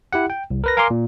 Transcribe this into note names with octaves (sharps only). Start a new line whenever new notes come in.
E4 G4 F#5
G5
C2
A#4 B4 A#6
A#4 F5 G#5 A#5 C6 D6
A#2